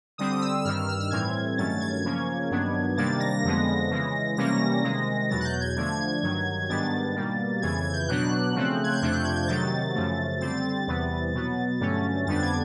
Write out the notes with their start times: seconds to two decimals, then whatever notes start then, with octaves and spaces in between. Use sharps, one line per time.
0.18 D3 G3 C4 D#6
0.32 D#6
0.42 E6
0.54 E6
0.65 G2 D#3 G3 F6
0.77 F6
0.88 E6
1.00 F6
1.11 A2 E3 G3 C4 G#6
1.58 G2 D#3 F#3 A3 C#4 A6
1.69 A6
1.81 G#6
1.93 G#6
2.04 C#3 F3 A#3 C#4
2.51 G2 D#3 F#3 B3 D4
2.97 C3 D#3 G3 A#3 D4 A6
3.20 A#6
3.44 F2 D3 F3 G#3 B3
3.90 C#3 E3 G#3
4.36 C3 E3 G3 A#3 C#4 A#6
4.83 C3 D#3 G#3
5.30 E2 B2 F#3 A6
5.40 F#6
5.45 G6
5.61 G#6
5.76 D3 F3 A3 D4 G#6
6.23 G2 D#3 F#3
6.69 G#2 D#3 G3 B3 D4 A6
7.15 B2 G3 A#3
7.62 F2 C#3 E3 G#6
7.78 G#6
7.93 G6
8.08 B2 F#3 B3 D4 F#6
8.55 C#3 F3 A3 C4
8.84 G#6
8.93 G6
9.01 F2 C3 F3 A3 D4 F#6
9.13 G6
9.25 G#6
9.36 G6
9.48 C3 D#3 F#3 A6
9.95 F#2 C#3 F3 A3
10.40 D3 G3 C4 A6
10.87 E2 C3 E3 G3 B3
11.34 B2 F#3 B3
11.80 G2 D3 F#3 A3 C#4
12.26 F2 D3 G3 B3 D4 A6
12.42 G#6